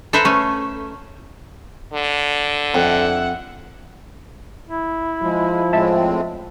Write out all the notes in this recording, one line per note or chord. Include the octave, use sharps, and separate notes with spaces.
A4 B4 C5 E5 A#5
A3 C#4
D3
F2 E5 F#5
E4
F3 G#3
A2 G#3 C4 E5 A5